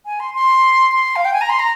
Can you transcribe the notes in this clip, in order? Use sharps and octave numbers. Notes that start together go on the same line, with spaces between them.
G#5
C6
C6
C6
F5
G5
G#5
A#5
C6
A#5